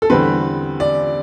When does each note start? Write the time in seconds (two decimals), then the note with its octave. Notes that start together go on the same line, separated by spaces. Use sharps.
0.02 A4
0.10 E2 D3 G3 C4 B4
0.80 D5